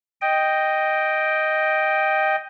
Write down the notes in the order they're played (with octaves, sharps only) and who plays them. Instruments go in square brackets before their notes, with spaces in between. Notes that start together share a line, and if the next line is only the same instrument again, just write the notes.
[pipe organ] D#5 G5